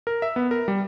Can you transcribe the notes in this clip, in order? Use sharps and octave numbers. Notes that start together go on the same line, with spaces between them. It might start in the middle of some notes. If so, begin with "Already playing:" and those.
A#4
E5
B3
A#4
G3